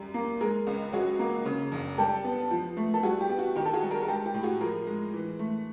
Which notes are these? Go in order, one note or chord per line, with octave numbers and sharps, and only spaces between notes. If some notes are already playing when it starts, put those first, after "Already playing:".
Already playing: F#2 G3
A#3
G#3 G#4 A#4
C#2
F#3 F#4 G#4
A#3
C#3
F#1
G3 G4 A4
B3
F3
A3
A4
G3 F#4 G#4
G4
B3
F#4
D#3 G4
A4
F#4 G#4
G3
G#4 A#4
A#4
G#3 G4 A4
G4
A2
F#4 G#4
F3 G#4 A#4
G#3
E3
A3